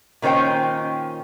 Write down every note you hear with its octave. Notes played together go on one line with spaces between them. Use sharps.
A#2 D#3 C#4 C5 G5